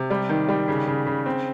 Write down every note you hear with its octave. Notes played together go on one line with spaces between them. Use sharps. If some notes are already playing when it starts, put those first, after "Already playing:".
Already playing: C3
G3
D#3
G3
C#3
C#3
C#3
C4